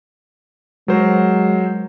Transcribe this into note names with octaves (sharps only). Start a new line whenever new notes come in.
F#3 G#3 A#4 C5